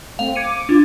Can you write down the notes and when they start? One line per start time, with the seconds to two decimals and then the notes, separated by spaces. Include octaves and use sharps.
0.19 A3 C4 F5
0.36 D6 G#6 C#7 D#7
0.69 D4 F4